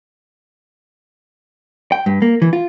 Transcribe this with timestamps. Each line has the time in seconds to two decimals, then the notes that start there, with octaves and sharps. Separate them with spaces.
1.92 G5
2.06 G2
2.22 A#3
2.42 E3
2.53 F4